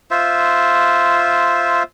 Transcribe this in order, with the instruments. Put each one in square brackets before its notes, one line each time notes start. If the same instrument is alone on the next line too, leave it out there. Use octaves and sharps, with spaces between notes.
[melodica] F4 C5 E5